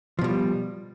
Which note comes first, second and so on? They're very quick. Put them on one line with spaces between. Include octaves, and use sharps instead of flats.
F3 B2 G3